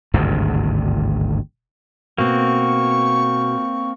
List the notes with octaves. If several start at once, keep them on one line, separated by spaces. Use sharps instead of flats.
G#1 D2 G2 C3
B2 A#3 C4 C#6